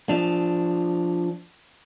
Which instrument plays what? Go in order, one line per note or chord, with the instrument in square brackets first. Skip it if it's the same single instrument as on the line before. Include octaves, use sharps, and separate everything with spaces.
[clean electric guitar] F3 D4